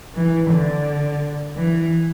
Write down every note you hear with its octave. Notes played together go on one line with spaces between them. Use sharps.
E3
D3
E3